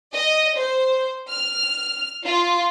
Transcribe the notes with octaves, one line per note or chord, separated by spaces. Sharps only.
D#5
C5
F6
F4